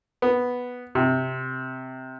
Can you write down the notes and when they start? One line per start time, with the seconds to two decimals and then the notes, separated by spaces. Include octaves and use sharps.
0.22 B3
0.95 C3